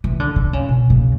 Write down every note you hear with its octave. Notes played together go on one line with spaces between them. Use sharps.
E3
D3
D3
C#3
B2
C#3